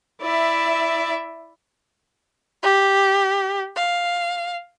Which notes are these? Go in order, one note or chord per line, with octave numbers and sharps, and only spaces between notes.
E4 D5 E5
G4
F5